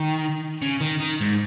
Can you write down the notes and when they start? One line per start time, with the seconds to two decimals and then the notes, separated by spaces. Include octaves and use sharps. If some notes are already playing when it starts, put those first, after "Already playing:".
Already playing: D#3
0.62 C#3
0.81 D#3
1.00 D#3
1.21 G#2